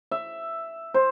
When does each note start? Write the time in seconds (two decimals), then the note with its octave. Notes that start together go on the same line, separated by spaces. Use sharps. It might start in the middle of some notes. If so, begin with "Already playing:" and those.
0.11 E5
0.94 C5